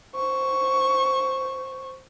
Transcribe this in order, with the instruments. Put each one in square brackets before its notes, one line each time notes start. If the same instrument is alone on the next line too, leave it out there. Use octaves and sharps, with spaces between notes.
[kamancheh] C5 C#6